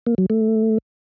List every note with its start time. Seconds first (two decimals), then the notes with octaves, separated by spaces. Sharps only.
0.06 A#3
0.18 F#3
0.30 A3